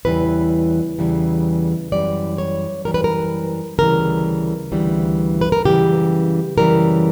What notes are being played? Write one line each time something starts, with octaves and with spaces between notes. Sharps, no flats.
E2 C#3 E3 G3 B4
E2 C#3 E3 G3
F#2 E3 G3 D5
C#5
F#2 E3 G3 A#4
B4
A#4
D2 C#3 E3 G3 A#4
D2 C#3 E3 G3
B4
A#4
F#2 C#3 E3 G3 G4
F#2 C#3 E3 G3 A#4